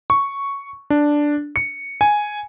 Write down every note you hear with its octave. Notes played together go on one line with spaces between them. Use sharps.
C#6
D4
C#7
G#5